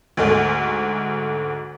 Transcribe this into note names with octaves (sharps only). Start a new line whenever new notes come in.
D2 G#2 A3